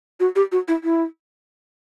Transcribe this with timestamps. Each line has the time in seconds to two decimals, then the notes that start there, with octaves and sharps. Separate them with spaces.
0.20 F#4
0.36 G4
0.52 F#4
0.68 E4
0.84 E4